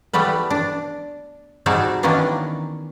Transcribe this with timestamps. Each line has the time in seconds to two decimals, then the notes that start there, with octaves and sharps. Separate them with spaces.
0.13 E3 G3 A3 B3 B4
0.50 D4
1.66 G3 C4 D#4 F#4 G#4 A5
2.03 D#3 E3 A#3 B3 C#4 D4